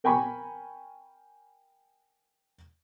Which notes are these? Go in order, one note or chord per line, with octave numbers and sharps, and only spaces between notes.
A#4 G5 G#5 B5 C#6